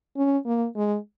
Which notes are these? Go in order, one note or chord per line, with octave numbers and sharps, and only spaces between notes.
C#4
A#3
G#3